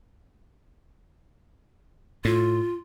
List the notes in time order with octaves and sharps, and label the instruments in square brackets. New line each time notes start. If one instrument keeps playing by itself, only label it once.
[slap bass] A2 [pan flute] F4